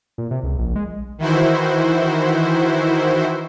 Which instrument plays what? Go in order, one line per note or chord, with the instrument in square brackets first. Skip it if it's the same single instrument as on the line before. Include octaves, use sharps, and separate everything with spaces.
[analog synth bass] A#2
C3
C#2
A#1
G#3
[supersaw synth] D#3 E3 E4 F#4 C5